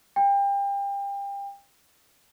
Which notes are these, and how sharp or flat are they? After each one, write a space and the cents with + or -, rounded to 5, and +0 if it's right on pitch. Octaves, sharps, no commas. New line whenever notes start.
G5 +30